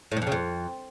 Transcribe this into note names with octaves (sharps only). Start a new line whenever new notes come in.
A2
G#2
F2
C#3
F2